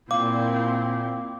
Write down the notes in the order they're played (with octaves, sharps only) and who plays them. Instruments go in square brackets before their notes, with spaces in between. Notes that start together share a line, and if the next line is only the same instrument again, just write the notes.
[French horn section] A#2 [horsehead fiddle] C4 E4 [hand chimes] F5 [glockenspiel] D6